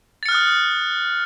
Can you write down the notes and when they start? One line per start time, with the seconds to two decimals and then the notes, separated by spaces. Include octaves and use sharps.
0.23 A6
0.26 C#7
0.29 F6
0.32 F#6
0.35 D#6